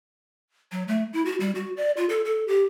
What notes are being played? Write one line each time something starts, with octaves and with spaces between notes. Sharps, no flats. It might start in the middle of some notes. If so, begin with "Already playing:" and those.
F#3
A3
E4
F#4
G3
F#4
D5
F4
A4
A4
G4